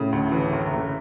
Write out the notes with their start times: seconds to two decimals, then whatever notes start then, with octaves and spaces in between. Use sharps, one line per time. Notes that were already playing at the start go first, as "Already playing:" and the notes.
Already playing: A2 C#3
0.12 D2
0.32 E3
0.53 F#1
0.73 F#1